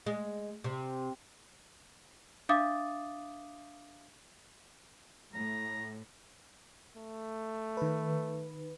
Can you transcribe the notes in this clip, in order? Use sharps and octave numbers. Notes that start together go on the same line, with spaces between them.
G#3
C3
D4 E5 F5 D6 D#6 A6
A2 A#5
A3
D#3 B4